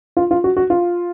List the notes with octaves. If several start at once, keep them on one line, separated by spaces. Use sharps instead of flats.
F4
F4
F#4
F#4
F4